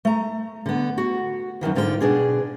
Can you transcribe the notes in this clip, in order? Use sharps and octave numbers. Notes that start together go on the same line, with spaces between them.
A3 A#5
D3 B3
F#4
F#2 A2 D#3 E3
G#2 D3 F4 A#4 G5
B2 D4 G#4